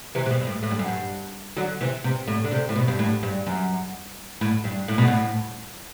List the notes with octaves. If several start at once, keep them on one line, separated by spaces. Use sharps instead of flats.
C3 E3
C3
B2
G2
A2
A2
G2
F#2
G2
D3 F#3
C3 E3
C3
A2
D3
C3
A2
B2
G2
A2
G2
F#2
A2
G2
A2
B2
A2